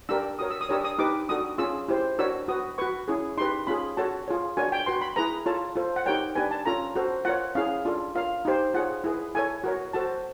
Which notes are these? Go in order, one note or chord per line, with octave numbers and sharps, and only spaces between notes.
D4 G4 A#4 E6
F#4 A#4 C#5 D#6
E6
D#6
D4 G4 A#4 C#5 E6
D#6
D#4 G4 B4 D6
D4 F#4 A4 D#6
C#4 F4 G#4 E6
E4 G4 C5
D4 F#4 A#4 C#5 E6
F#4 B4 D#6
F#4 B4 C#6
C#4 E4 G#4
D#4 G4 B4 C6
C#4 F4 G#4 B5
F#4 A4 C#5 A5
F4 G#4 C#5
D4 F#4 A#4 C#5 G#5
G5
F#4 B4 C6
B5
E4 G#4 B4 A#5
F4 A4 C#5 A5
F4 A4 C5
F#5
D#4 G4 A#4 C#5 G5
D4 G4 B4 G#5
A5
C#4 F4 A4 A#5
F#4 A4 C5
F4 A#4 C#5 F#5
C#4 E4 G#4 F5
D4 F4 A4
F4 A#4 C#5 F5
D#4 G4 C5
F4 G#4 C#5 F#5
E4 G#4 B4
E4 A4 C#5 G#5
F#4 A#4 C#5
F#4 A4 C5 A5